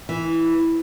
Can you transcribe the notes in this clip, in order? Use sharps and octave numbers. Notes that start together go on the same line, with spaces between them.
E3